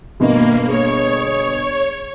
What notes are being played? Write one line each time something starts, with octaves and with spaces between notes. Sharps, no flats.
G1 B2 D#3 A#3
G#4 C#5